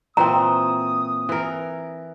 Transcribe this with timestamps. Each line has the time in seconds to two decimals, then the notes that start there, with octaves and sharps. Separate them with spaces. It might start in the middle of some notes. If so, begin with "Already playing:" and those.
0.17 A#2 E3 C4 A#5 D#6
1.29 E3 A#4